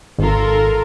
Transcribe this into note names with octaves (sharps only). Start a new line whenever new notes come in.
G#1 F4 A4 A#4